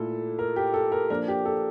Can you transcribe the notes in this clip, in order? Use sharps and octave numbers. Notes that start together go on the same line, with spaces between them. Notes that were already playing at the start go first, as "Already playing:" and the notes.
Already playing: A#2 A3 E4 A4
A#4
G4
A4
A#4
F3 A#3 D4 A#4
G4
A4